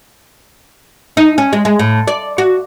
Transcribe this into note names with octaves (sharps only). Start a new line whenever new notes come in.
D#4
C#4
G#3
G#3
A2
D5
F#4